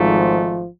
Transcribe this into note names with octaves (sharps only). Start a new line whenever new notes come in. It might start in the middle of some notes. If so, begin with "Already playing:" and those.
Already playing: G#1 G#2 F3 A3